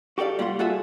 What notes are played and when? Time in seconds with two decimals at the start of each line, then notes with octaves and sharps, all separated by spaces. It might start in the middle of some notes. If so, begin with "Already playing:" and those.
0.18 F#4 G4 A4 D5 F5
0.39 G3 A#3 F4 F#5 C6
0.59 F4 F#4 G#4 A4 E5